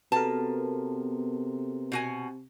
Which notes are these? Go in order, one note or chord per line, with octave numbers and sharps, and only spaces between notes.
C3 B3 F#4 A4 A#4 A5
B2 F#4 G#5